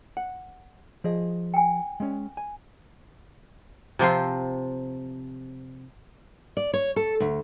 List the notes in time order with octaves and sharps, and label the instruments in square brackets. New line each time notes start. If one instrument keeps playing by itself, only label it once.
[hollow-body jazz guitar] F#5
F3 G#4 D#5
[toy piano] G5 G#5
[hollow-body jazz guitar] G#3 C#4
G#5
[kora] C3 F3 C4 F4
[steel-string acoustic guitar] D5
C#5
A4
D2